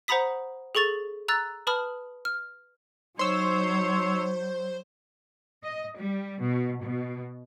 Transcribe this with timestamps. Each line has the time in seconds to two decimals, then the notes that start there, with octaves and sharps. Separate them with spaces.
0.08 C5 F#5 A#5 B5 D#6 B6
0.75 G#4 A4 C#6 A6 F7
1.28 A#5 E6 F#6 A6
1.67 B4 A5 B5 D#6 F6
2.25 F6
3.19 F#3 D#4 C5 C#5 C6 E6
5.64 D#5
5.97 G3
6.42 B2
6.82 B2